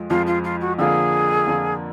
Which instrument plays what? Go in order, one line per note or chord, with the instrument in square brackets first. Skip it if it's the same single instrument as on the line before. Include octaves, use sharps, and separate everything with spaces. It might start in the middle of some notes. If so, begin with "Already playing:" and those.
Already playing: [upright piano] F2 F3 G#3
[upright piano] F2 F3 G#3 [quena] F4
[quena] F4
F4
F#4
[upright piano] F2 D3 F3 A#3 F4 [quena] G#4
[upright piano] F2 D3 F3 A#3 F4